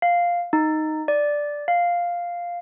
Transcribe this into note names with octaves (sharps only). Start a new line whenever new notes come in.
F5
D#4
D5
F5